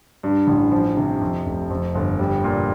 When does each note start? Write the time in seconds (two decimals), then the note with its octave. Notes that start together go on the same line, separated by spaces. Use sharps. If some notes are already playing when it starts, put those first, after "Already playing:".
0.23 G2
0.47 A1
0.72 F3
0.97 C3
1.21 F2
1.46 F1
1.70 F2
1.95 G1
2.19 G3
2.44 A#2